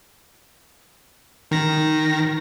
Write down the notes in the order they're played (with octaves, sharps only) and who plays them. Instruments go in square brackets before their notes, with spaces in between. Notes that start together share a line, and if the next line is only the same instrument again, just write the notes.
[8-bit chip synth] D#3 A#6